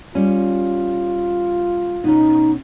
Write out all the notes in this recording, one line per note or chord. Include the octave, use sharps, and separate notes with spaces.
G3 C#4 F4
B2 C#4 D#4